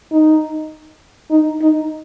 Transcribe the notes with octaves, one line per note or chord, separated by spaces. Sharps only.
D#4
D#4
D#4